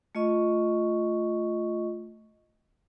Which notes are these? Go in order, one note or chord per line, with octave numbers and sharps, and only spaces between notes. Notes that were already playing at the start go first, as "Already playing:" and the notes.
A3 F4 D#5 C#6